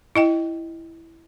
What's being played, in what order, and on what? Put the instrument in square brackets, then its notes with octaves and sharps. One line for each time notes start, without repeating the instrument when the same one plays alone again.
[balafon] E4 D#5 G5